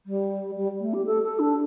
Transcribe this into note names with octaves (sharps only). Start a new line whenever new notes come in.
G3
G3
A3
G4
A4
A4
D4